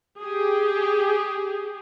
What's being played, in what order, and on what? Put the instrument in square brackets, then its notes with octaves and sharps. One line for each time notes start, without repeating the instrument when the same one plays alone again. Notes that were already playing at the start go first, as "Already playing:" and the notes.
[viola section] G4 G#4